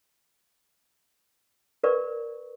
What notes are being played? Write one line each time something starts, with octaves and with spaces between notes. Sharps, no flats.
A#4 B4 D5 C#6